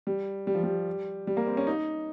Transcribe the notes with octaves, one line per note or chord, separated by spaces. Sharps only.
G3
G3
F3
G3
G3
A#3
C4
C#4
D#4